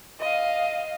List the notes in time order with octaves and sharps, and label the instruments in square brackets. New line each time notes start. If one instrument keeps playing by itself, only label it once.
[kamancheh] D#5 F5